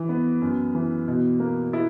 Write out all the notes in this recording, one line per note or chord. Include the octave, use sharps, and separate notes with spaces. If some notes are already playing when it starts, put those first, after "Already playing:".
Already playing: E3
B3
F#2
E3
B2
A#3
E4